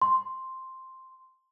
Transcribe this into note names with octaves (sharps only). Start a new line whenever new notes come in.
C6